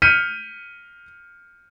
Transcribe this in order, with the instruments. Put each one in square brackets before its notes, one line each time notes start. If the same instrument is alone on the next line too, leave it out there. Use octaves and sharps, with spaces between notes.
[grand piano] F6 G6 B6 C#7 D#7